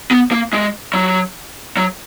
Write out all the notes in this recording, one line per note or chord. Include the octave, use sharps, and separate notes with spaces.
B3
A#3
G#3
F#3
F#3